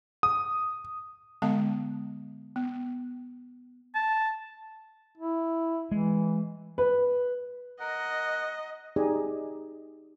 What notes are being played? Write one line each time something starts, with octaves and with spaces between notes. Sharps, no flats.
D#6
D3 G#3 B3 F5 A5
B3
A5
E4
E3 G#3
B4
A#4 D#5 F#5
D#4 G4 G#4 D5 D#5 G#5